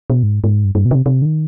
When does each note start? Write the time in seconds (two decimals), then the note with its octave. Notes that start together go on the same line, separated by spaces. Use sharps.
0.10 B2
0.23 G#2
0.44 G#2
0.65 G2
0.75 G2
0.85 B2
0.91 D3
0.95 C3
1.06 C3
1.22 D3
1.26 D#3